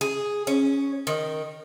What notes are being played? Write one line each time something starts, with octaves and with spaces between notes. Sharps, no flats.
G#4
C#4
D#3